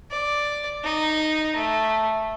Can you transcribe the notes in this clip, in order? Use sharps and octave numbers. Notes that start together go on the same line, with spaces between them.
D5
D#4
A3